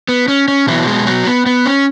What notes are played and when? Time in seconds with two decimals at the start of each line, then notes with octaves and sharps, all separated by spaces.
0.08 B3
0.28 C#4
0.48 C#4
0.67 B2 E3 F#3 B3 E4
0.87 G#3 G#4
1.06 F#3 F#4
1.27 B3
1.46 B3
1.66 C#4